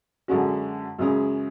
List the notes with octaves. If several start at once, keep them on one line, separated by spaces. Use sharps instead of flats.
F#2 D3 G#3 C#4 F#4
F#2 C#3 G#3 C#4